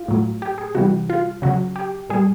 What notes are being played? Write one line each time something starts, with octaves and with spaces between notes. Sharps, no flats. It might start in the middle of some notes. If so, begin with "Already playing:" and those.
Already playing: F4
A2 F#3
G4
G#4
C3 E3 G3 F#4
F4
C#3 F#3 F#4
G4
A#2 G3 G#4